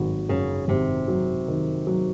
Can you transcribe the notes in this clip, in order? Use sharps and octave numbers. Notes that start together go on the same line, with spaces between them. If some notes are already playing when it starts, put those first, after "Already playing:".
Already playing: G#1 F#3
F#2 C#3
G#1 C3
F#3
D#3
F#3